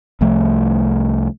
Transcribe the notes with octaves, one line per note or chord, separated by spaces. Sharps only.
C2 F3 A3